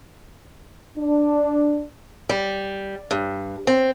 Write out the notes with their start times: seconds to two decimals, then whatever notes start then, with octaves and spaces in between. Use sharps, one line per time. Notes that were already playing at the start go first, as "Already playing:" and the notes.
0.97 D4
2.29 G3
3.11 G2
3.67 C4